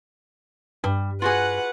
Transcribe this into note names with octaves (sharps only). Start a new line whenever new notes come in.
G2 G3
F4 F#4 G#4 B4 F#5